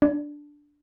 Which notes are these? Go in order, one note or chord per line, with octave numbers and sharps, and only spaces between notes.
D4